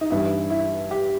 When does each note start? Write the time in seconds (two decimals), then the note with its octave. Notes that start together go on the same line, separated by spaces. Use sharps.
0.01 D#4
0.10 G2 E3 G3 E4
0.50 E4
0.91 G4